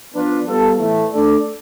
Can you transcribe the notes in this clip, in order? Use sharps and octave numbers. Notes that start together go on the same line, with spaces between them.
F3 B3 D4 F4 B4
G3 B3 F4 A4
A2 E3 A3
A3 D4 A4 D5